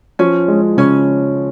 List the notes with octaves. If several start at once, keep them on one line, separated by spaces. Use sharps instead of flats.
F3 C#4
G#3
C#3 C#4